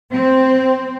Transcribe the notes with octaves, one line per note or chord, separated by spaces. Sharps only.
C4